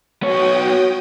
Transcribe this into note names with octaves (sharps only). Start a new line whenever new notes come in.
B3 F#4 C#5 G5 D#6